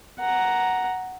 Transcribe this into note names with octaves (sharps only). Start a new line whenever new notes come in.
F#5 A#5